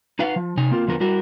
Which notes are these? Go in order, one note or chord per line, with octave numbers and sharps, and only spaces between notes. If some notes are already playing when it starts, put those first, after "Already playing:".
D#4 B4 F5 F#5
F3
C3 D#4 G#5
A#3 C4 F4 A#4
E2 D3 F3 B3 A#4
G3 E4 F#4 A#4